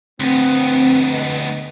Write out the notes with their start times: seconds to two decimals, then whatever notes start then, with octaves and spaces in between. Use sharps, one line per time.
0.20 D2 B3 C4
1.11 D3 D#5